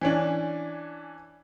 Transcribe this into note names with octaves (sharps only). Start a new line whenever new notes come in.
E3 C#4 D4